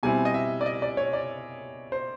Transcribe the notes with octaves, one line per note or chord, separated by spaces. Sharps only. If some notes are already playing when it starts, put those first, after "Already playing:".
B2 G3 C4 E4 G#5
D#5
E5
D5
D#5
D5
C#5
D5
C5